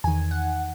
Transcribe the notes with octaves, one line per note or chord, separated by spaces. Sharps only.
E2 D#3 G#5
F#5